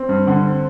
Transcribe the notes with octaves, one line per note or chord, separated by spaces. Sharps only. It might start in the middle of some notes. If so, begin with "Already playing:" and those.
Already playing: C4
G2
D3
C4